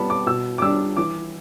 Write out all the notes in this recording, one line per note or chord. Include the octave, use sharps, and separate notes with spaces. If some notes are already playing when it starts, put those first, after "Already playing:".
Already playing: G3 B3 A5 B5
D6
B2 E6
D6
G3 D4 E6
E3 D6